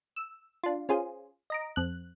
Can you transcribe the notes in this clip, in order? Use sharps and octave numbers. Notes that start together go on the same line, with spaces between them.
E6
D4 F4
C#4 F4 G#4 C5
D#5 A#5 D7
F2 F#6